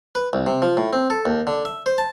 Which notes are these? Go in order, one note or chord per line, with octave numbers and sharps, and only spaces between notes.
B4
C2
C3
F3
A2
C4
A4
D#2
D3
E5
C5
A5